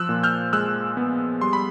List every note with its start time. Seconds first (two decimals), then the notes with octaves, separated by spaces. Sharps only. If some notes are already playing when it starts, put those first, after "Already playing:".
Already playing: F3 E6 F#6
0.09 A#2
0.23 F6 G6
0.53 G#3 E6 F#6
0.97 B3
1.41 G3 C6
1.53 B5